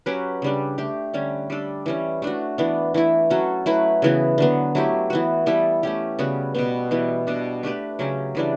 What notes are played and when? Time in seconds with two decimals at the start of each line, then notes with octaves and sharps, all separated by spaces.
0.06 F#3 C#4 G4 B4
0.42 C#3 G3 D4
0.78 A3 D4 G4
1.14 D3 G3 C#4
1.50 G3 D4 A4
1.86 E3 G3 C#4
2.22 A3 D4 F#4
2.58 E3 B3 D4
2.94 E3 A3 E4
3.30 F#3 C#4 F#4 A4
3.66 F#3 A3 E4 B4
4.02 C#3 E3 B3 F#4
4.38 D3 F#3 B3
4.75 F#3 A3 E4 G4
5.10 E3 B3 F#4
5.46 G3 B3 E4 A4
5.83 A3 C#4 G4
6.19 C#3 G3 B3 F#4
6.55 B2 G3 B3
6.91 E3 G3 B3
7.27 B2 G3 D4
7.63 A3 D4 G4 B4
7.99 C#3 F#3 C#4 G4
8.35 C#3 E3 G3 D4